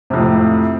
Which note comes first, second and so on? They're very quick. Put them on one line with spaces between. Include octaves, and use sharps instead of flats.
C3 F2 A2